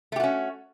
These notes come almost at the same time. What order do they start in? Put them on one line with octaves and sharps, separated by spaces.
A3 G4 F#4 C#4